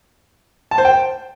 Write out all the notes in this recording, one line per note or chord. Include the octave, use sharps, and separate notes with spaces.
A5
C5
G5